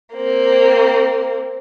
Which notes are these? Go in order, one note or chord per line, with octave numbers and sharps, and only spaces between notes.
A#3 C4